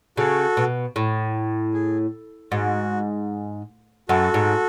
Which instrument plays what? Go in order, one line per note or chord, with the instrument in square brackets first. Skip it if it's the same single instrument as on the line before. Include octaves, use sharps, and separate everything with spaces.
[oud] C#3 [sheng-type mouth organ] F#4 A4
[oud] B2
A2
[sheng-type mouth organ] G#4
[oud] G#2 [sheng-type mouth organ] F#4
[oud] F#2 [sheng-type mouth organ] F#4 A4
[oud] G#2